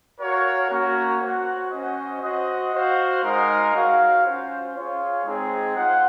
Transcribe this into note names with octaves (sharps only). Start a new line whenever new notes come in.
F#4 A#4 C#5 F5
A#3 C#4 F#4 A#4 C#5
F#4 C5 F#5
C#4 F#4 C5 D#5
F#4 C5 D#5
F#4 C5 F5
G#3 D#4 A#4 F5
F#4 C#5 F5
C#4 F4 C5
F4 G#4 C#5 F5
G#3 C4 D#4 G#4
F4 C5 F#5